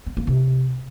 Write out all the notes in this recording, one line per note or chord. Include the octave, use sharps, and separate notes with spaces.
B3
A#3
C3